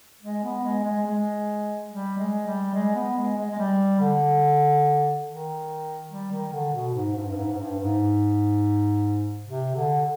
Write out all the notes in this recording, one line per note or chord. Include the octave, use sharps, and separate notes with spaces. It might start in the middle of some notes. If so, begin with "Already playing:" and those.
G#3
B3
G#3
G#3
G#3
G3
G#3
G3
G#3
B3
G#3
G#3
G#3
G3
D3
D#3
G3
D#3
D3
B2
G#2
G2
G2
G#2
G#2
G2
G#2
C3
D3